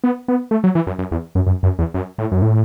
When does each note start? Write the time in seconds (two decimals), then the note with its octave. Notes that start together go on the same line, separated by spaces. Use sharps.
0.04 B3
0.28 B3
0.51 A3
0.64 F#3
0.75 E3
0.87 F#2
0.99 F#2
1.12 E2
1.35 F#2
1.47 F#2
1.63 F#2
1.79 E2
1.94 F#2
2.18 A2
2.32 F#2
2.42 A2